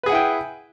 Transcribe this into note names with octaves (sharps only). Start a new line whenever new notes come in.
E4 G#4 B4 F#5 G5